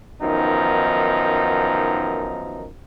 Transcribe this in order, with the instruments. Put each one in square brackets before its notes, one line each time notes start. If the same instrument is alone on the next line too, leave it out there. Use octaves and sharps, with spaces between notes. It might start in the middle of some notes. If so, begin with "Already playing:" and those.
[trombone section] F#2 D#3 F3 B3 D#4